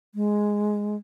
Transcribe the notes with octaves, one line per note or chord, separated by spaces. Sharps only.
G#3